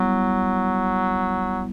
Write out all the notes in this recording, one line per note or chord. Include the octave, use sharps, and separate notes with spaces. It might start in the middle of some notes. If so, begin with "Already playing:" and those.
Already playing: F#3 G3 B3 E4